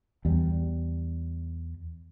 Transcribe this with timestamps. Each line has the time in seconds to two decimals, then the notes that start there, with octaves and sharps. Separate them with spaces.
0.25 E2 G3